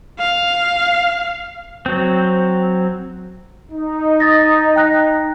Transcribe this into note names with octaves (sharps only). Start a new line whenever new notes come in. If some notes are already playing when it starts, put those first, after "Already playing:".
F5
F#3 C4
D#4
D#6 A6 A#6
G5 F#6 A#6